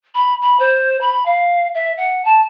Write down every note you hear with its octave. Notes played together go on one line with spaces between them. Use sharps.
B5
B5
C5
B5
F5
E5
F#5
A5